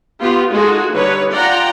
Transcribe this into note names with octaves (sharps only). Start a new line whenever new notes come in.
B3 F4 G4
G#3 D#4 F4 F#4 G#4 A4
D3 G3 D#4 B4 C#5
F4 D5 F#5 G5 A#5